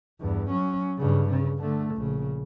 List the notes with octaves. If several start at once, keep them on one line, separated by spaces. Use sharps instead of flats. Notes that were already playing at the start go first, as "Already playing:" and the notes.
E2 G2
F#3 C#4
G2 C#3
C#3
D3 A3
A#1 C#3